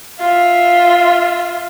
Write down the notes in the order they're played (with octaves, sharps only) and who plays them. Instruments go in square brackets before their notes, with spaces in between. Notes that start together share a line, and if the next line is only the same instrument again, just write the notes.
[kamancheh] F4 E5